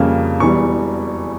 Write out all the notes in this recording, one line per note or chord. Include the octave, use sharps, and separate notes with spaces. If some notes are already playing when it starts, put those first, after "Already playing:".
Already playing: F2 C#3 G3 A#3 C#4
E1 E2 E3 G3 C#6